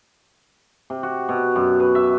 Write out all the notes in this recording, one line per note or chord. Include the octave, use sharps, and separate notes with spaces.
C3
F#4
B2
F#2
B4
E5